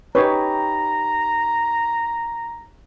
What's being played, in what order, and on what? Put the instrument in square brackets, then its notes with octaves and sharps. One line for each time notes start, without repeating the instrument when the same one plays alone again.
[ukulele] D#4 G4 B4 [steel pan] C#5 [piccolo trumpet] A#5